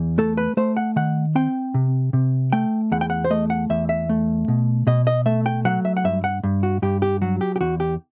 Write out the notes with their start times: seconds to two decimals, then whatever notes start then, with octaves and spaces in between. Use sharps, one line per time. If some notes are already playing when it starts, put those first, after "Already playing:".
Already playing: E2
0.18 A3 A4
0.37 B4
0.57 A3 C5
0.77 F#5
0.96 D#3 F#5
1.35 C4 G5
1.74 C3
2.13 C3
2.53 A3 G5
2.92 E2 F#5
3.01 G5
3.10 F#5
3.25 C5
3.30 A3 D#5
3.50 F#5
3.70 E2 E5
3.89 E5
4.09 A3
4.48 B2
4.87 B2 D#5
5.07 D#5
5.26 A3 E5
5.46 G5
5.65 F#3 F#5
5.85 E5
5.97 F#5
6.04 G2 E5
6.24 F#5
6.44 G2
6.63 F#4
6.82 G2 G4
7.02 G4
7.22 F#3 F#4
7.41 G4
7.56 G4
7.61 E2 F#4
7.80 G4